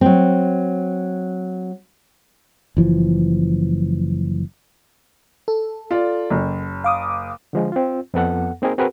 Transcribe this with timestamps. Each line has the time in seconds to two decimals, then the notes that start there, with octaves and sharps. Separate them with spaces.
0.01 F#3 C4
2.77 F#1 E3 F3
5.48 A4
5.91 F4 D5
6.30 F#1
6.84 F5 D6 D#6
7.53 D3 F3 G#3
7.72 C4 F4
8.14 F2 B3 A4 F#5
8.62 A#3 C4 D#4 G#4 A#4
8.78 C4 F#4 G#4 A#4 B4